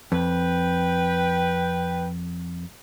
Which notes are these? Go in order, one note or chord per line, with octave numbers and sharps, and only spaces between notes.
F2 B4 G5